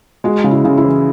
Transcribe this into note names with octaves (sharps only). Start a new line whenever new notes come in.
G#3 F#4
C#3
E4
C#3
E4
E3